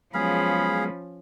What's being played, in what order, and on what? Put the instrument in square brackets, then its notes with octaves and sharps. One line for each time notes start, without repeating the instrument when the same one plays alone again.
[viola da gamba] F3 C#4 [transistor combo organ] F#3 G#3 B3 [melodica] G#4 F5 [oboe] B5